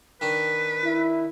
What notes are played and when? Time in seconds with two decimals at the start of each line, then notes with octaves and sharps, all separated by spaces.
0.21 D#3 D4 B4
0.84 E4